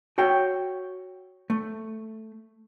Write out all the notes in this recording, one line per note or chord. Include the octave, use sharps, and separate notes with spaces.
F#4 C#5 G5
A3